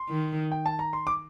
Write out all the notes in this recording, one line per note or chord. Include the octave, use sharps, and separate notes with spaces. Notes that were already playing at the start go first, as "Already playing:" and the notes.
Already playing: C6
D#3
G5
A5
A#5
C6
D6